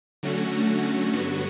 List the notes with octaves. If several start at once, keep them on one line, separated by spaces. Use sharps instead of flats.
D3 F#3 A3 C#4 F#4
G2 D3 F#3 B3 F#4